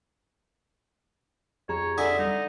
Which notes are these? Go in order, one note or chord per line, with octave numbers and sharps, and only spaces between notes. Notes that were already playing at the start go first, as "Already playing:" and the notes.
F2 G4 G#4 C#5 A#5
D3 D#5 E5 G#5
G3 D#4